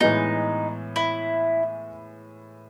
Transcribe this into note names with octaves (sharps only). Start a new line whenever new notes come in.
A2 E3 G#3 B3 D#4
E4